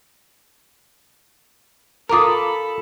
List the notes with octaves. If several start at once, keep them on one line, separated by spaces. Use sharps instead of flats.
F4 A4 A#4 A#5 B5 D6 D#6